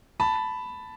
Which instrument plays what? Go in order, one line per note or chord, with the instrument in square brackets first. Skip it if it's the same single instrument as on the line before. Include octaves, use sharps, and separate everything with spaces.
[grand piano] A5 B5